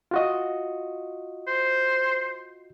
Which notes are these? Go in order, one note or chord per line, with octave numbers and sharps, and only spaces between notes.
F4 F#4 D#5
C5